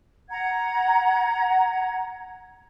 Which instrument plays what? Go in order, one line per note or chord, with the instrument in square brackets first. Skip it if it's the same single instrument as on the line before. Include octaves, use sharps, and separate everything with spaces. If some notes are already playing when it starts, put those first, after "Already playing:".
[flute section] F#5 A#5 G#6